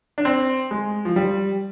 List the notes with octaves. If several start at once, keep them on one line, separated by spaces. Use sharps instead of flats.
D4
C4
G#3
F3
G3